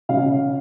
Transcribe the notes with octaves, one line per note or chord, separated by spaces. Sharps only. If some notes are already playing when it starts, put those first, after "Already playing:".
C#3 F5